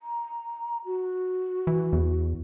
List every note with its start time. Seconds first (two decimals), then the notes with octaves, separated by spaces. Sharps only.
0.01 A#5
0.86 F#4
1.67 E3
1.93 E2